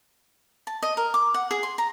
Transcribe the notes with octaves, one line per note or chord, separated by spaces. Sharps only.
A5
D#5
A#4
D6
F#5
G#4
C6
A#5